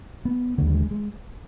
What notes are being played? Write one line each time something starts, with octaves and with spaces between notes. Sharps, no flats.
B3
D#2 D3 A3
G3
G#3
G#3